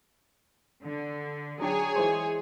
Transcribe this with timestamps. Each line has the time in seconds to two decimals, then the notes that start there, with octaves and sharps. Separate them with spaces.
0.82 D3
1.60 F#3 D4 G#4 C#5 G5 G#5
1.95 E3 G#3 C5